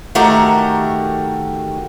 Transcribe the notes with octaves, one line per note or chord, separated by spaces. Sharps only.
D#3 A3 F#4 G4 A#4